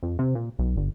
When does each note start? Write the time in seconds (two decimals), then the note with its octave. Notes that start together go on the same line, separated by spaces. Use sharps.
0.03 F2
0.19 C3
0.35 A#2
0.59 B1
0.77 G1